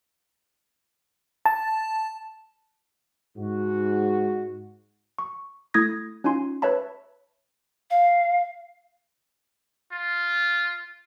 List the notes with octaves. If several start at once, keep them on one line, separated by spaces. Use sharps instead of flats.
A5
G#2 F#4
C#6
A3 E4 D#6 G#6 A#6
C#4 D#4 F4 G#5 C6
B4 C#5 E5 A5 B5
F5
F4